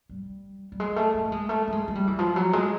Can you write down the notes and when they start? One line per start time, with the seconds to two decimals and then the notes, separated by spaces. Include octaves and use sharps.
0.09 G3
0.72 G3
0.80 G#3
0.96 A3
1.14 A3
1.25 A3
1.32 G#3
1.49 A3
1.68 A3
1.72 G#3
1.88 G#3
1.95 G3
2.07 E3
2.19 F3
2.36 F#3
2.53 G#3